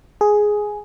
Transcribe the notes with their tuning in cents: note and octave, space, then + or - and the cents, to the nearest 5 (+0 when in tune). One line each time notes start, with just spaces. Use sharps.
G#4 +5